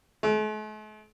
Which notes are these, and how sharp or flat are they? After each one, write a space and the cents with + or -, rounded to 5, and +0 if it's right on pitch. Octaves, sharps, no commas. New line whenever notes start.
A3 -45